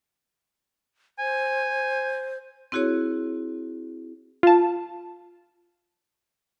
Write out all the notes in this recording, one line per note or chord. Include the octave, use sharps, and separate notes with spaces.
C5 G#5
C4 E4 F#4 G#4 C#5
F4 A5